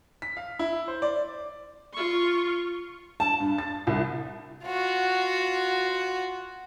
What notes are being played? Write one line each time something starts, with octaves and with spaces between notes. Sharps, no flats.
B6
F5
E4
C5
D5
F4 C#6
A5
G2
A6
C2
F4 F#4